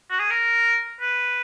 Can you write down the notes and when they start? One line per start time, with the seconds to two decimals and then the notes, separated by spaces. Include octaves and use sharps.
0.10 F#4
0.19 G#4
0.30 A#4
1.01 B4